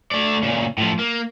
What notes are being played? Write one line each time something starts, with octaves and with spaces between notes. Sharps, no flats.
A3 D5
A#2 C#3
A2 F3
A#3